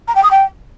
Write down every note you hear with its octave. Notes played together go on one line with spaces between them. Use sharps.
A#5
G5
D#6
G5